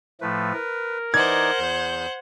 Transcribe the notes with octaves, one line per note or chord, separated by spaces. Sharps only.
A2 F3 A3 B4
A#4
E3 D#4 C5 D5 F#5 G#6
E2 G6